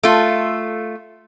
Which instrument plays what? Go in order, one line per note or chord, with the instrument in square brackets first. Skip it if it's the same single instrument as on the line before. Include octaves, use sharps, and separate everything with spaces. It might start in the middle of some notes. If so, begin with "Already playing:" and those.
[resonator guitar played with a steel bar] A3 F4